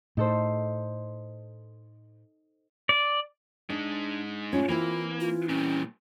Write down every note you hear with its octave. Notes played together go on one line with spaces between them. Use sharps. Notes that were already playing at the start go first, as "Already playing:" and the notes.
A2 D#4 A4 C5
D5
G#3 D4 D#4
A2 C#4 F4
E3 A#3 C4 E4
F4
A#2 G3 C#4